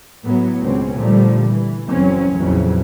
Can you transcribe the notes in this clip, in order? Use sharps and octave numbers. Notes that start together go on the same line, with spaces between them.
A2 F#3 B3
C#2 B2 C4 C#4
A#2 D3 F3 G3 A3
E3
F#1 F#2 E3 F#3 C4 C#4
A#1 F2 C#3 E3 F#3